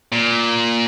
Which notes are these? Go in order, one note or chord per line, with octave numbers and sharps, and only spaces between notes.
A#2